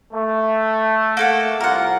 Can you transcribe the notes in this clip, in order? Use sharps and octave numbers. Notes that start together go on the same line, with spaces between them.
A3
A#3 A4 F#5
C2 F4 A#4 F#5